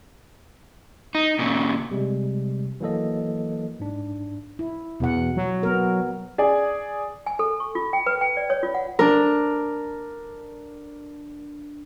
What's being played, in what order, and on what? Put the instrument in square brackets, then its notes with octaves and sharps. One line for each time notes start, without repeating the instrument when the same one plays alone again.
[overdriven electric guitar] D#4
A#2 C#3
[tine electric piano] C3 G3 G#3
E3 F#3 A#3 A4 D#5
G#2 D4
[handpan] E4
[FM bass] E2 [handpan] B2 F#5
[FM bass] F#3
[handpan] B3 A#4
[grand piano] G#4 D5 G#5
[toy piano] G#5
A4
C#6
F4
G5
B4
G5
D5
C#5
F4
F#5
[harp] D4 A#4